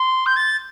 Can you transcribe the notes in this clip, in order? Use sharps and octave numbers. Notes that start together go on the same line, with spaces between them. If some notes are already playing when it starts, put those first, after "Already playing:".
Already playing: C6
G6
A6